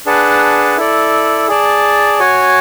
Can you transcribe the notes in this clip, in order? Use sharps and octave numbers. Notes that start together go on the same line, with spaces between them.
D4 G#4 B4 F#5 A5
E4 A4 D5
G#4 D5 A5
F#4 C#5 G#5